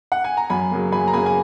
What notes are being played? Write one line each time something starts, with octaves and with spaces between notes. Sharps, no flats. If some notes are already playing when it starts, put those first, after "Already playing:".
F#5
G#5
A#5
F#2 G#5 B5
C#3 F#3 A#3
F#2 G#5 B5
A#5
C#3 F#3 A#3 G#5 B5
G#5